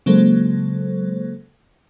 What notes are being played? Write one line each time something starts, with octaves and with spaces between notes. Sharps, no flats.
C#3 F#3 G#3 A#3 A4 C5